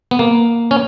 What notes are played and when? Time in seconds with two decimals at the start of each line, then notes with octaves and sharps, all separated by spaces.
0.11 B3
0.19 A#3
0.71 C#4